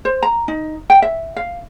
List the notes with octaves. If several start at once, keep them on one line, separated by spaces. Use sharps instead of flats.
C5
A#5
D#4
G5
E5
F5